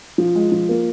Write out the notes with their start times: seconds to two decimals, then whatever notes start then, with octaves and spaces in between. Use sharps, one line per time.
0.18 F3
0.35 G#3
0.52 F3
0.69 A#3